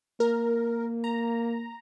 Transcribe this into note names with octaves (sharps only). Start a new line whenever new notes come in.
A#3 A#4
A#5